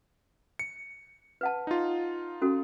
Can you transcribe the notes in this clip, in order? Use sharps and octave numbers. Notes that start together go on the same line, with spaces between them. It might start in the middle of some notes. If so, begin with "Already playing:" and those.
C#7
B4 F#5 A5
D#4 F4
C#4 F#4 A4